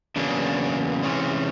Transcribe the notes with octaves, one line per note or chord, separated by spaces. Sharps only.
E2 C#3 F#3 A#3 D4
C3 E3 G#3 C#4